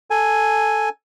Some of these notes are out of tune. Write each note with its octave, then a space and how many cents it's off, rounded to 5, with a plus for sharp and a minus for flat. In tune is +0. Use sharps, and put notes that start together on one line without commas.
A4 +0 G#5 +0